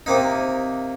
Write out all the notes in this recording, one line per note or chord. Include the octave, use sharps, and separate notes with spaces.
C3 A#3 D#4